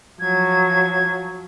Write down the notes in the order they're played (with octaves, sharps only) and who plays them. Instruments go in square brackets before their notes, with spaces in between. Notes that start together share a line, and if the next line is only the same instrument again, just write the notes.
[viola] F3 F#3 [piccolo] G#6